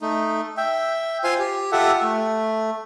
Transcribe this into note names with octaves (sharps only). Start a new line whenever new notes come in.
A3 D#4
E5 G5
F4 C5 F5 G#5 C6
G4
F4 G4 A4 E5 F#5
A3